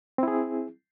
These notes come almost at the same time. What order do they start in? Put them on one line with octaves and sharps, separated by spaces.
C4 E4 G#4